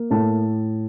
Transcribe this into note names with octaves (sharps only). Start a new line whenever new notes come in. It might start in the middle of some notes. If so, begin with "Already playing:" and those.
Already playing: A#3
A2 A5